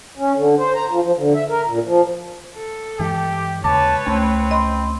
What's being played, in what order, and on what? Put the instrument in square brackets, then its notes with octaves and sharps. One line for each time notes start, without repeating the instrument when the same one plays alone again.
[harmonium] C#4
D3
C5
A#5
F3
F3
D3
E5
A#4
A#2
F3
[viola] A4
[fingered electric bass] G2 E3 G#3 [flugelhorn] G4
[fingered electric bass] D#2 C#3 G#3 [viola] B4 C#5 [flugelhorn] A5 [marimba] D6
[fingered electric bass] C#2 C#4 [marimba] A3 [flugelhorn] C4
[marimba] D#5 B5 C6